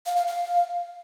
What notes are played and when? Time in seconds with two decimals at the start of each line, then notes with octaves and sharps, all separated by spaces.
0.06 F5
0.17 F5
0.27 F5